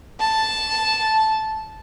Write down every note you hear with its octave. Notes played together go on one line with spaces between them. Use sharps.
A5